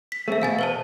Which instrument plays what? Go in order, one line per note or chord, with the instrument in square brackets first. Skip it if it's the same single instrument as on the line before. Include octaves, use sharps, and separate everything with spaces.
[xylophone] B6
[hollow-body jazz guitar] A3 C4 [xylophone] G#4 E5
[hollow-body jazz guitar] E2 B2 [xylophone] F5 G#5 A6
[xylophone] B4 C5 A5